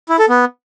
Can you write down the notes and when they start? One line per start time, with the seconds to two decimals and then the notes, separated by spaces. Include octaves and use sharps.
0.09 E4
0.19 A4
0.29 B3